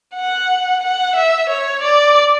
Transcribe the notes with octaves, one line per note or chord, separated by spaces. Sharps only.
F#5
F#5
E5
C#5
D5